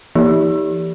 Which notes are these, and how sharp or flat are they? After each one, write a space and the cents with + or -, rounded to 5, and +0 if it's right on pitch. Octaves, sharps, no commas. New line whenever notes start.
E3 +40 D#4 +40 G4 +0